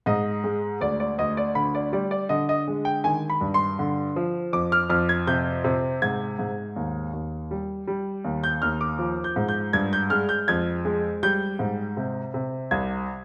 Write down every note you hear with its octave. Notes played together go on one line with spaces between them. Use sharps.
G#2 D#5
G#3
D2 D5
D5
D2 D#5
D5
D3 B5
D5
G3 D5
D5
D3 D#5
D#5
G#3
G5
D#3 G#5
B5
G2
C6
D3
F3
F2 D6
F6
F2 F6
G#6
C3 G6
C3
G#2 G#6
G#2
D#2
D#2
G3
G3
D#2
G6
D#2 F6
D6
F3
G6
G#2
G6
G2 G#6
G6
G#3 F6
G6
F2 G#6
G#3
G3 G6
G#2
C3
C3
C2 G#6